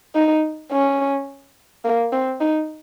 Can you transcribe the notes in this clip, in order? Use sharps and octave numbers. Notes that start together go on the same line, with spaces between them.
D#4
C#4
A#3
C4
D#4